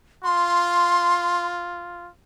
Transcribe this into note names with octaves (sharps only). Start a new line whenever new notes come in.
F4 C6